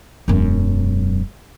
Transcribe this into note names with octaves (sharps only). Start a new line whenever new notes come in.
E1 F#2